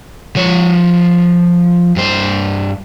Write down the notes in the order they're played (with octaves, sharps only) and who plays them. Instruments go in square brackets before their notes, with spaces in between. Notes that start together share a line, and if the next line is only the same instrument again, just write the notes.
[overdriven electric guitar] F3 C#5
G2 C5